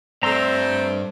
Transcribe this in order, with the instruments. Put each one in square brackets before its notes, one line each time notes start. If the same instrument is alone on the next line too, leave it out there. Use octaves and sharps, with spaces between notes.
[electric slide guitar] G2 D5 [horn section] A3 C4 [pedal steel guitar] A#5 C6 E6